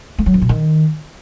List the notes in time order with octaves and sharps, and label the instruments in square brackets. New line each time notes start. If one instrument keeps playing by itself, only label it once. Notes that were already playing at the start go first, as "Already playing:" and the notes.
[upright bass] A3
F#3
F2
B2
D#3